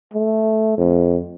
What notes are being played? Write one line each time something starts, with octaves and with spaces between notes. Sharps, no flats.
A3
F2